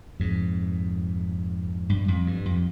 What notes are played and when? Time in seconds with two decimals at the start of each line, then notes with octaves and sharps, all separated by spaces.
0.20 F2 G#2
1.90 G2
2.08 F2
2.26 G2
2.46 F2